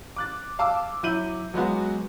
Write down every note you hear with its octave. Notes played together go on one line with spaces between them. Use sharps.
D6 F#6 A6
F5 A5 D6 E6
F#3 E4 G6 D#7 F#7
F#3 G#3 B3 F#4